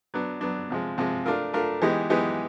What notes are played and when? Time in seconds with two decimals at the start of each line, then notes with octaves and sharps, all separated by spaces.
0.14 F#3 B3 D4
0.41 F#3 B3 D4
0.70 C3 F3 G#3
0.98 C3 F3 G#3
1.26 A3 D4 F4 A#4
1.54 A3 D4 F4 A#4
1.82 E3 G#3 B3 D#4 G4
2.10 E3 G#3 B3 D#4 G4